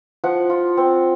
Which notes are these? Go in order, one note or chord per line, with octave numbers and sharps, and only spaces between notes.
F3 F#5
F4
C4